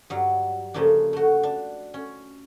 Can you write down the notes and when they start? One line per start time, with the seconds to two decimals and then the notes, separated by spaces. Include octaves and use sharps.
0.10 G2 F#3
0.74 C#3 F3 A3 A#3 D4
1.13 A3 F#4
1.43 D4
1.94 C#4